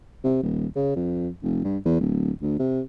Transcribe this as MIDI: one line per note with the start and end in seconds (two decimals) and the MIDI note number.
0.24 0.38 48
0.42 0.66 27
0.76 0.94 49
0.95 1.29 41
1.43 1.62 29
1.64 1.77 43
1.85 2.00 40
2.00 2.31 26
2.42 2.59 38
2.59 2.81 48